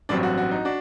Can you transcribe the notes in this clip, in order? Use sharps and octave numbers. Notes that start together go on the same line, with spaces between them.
A1 G2 F#3 C4 D4
F#4
F#4
D#4
D4 F#4